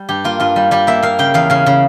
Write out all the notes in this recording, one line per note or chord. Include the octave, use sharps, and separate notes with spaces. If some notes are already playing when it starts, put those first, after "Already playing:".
Already playing: G3
G2 G4
A#3 F4
G2 F4
G3
G3 G4
A#3 E5
A#3 F5
C#3 G5
E2 F5
C#3 F5
C#3